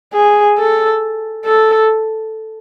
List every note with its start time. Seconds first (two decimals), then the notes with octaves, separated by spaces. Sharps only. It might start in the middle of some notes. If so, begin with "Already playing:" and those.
0.13 G#4
0.58 A4
1.45 A4